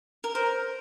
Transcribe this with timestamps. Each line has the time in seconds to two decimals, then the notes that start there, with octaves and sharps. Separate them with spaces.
0.24 A#4
0.35 A#4 C5